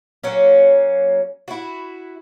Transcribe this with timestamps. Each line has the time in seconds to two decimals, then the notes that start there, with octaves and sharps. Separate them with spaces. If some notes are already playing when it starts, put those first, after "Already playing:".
0.24 F#3 A#3 C#4
1.48 E4 F#4